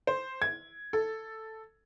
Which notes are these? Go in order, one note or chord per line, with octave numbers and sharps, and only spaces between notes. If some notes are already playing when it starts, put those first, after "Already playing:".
C5
G#6
A4